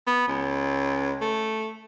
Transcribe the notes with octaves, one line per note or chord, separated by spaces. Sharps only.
B3
C#2
A3